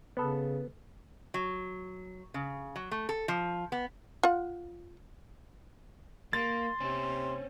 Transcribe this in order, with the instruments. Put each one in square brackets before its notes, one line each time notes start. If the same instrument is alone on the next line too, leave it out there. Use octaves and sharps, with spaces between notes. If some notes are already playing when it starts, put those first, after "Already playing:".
[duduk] C#3 [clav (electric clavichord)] B3 A4
[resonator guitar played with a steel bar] F#3
C#3
F#3
A3
A4
F3
B3
[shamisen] F4 F#5
[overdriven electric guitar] A#3 [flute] C6 [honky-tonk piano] A6
[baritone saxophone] C3 [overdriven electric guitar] C4 C#4